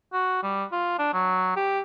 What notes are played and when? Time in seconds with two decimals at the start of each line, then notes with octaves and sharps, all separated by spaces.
0.13 F#4
0.43 G3
0.72 F4
0.98 D4
1.13 F#3
1.56 G4